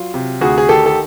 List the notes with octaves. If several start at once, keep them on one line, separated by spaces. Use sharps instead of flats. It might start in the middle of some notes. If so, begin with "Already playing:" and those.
Already playing: F#3 F4
C3
D2 F#4 G#4
G#4
D#3 G4 A4
A4